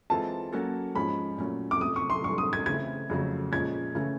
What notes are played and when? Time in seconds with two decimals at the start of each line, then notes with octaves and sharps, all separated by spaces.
0.10 E3 G#3 C4 F4 A4 A5
0.53 F#3 A#3 C#4 F#4 A4
0.95 G#2 F3 G#3 C#4 B5
1.38 A#2 F#3 A3 C#4
1.71 D6
1.81 C3 F3 A3 D#6
1.96 C#6
2.10 C6
2.24 G2 E3 A3 D4 C#6
2.38 D#6
2.53 G#6
2.66 C#3 E3 A3 C4 E4 G#6
3.10 F2 C#3 F#3 A3
3.52 A#2 F3 G#3 C#4 G#6
3.95 C#3 E3 A3 C#4